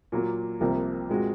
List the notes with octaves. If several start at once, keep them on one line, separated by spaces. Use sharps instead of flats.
A#2 F#3 A#3
C2 C3 F3 A#3
A#2 G#3 C4 F#4